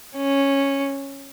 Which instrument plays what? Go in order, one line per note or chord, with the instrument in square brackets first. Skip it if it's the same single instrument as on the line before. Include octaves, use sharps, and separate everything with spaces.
[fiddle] C#4